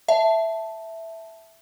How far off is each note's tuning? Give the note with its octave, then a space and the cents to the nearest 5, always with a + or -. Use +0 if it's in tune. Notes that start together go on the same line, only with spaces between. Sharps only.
E5 +0 A5 +0